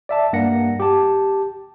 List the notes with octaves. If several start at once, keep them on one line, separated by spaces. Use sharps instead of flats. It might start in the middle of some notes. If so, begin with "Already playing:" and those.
D5 E5 A5
G2 A#3 F#5 A#6 C#7
G4 A5